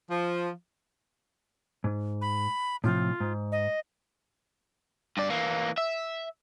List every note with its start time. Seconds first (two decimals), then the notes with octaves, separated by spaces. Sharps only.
0.10 F3
1.84 G#2
2.21 B5
2.84 A2 C3 F3 F4
3.20 G#2
3.52 D#5
5.17 G2 D5
5.30 E3 A#3
5.78 E5